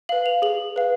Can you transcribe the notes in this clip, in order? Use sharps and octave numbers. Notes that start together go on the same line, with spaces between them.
B4 F5 F#7
F7
G#4 F#7
B4 F5